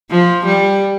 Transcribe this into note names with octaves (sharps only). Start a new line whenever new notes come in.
F3
G3